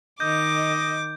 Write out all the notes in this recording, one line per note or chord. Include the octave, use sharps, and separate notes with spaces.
D#3 D#5 D6 G6